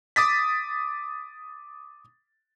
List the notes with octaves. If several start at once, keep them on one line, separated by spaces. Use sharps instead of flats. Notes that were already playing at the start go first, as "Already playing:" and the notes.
D6 D#6 A6 B6